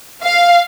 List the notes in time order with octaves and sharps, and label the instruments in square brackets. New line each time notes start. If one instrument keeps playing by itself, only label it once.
[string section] F5